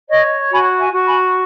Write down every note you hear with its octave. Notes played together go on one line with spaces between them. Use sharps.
C#5 D#5
F#4 G#5 B5
E5 G#5
F#4
G#5 B5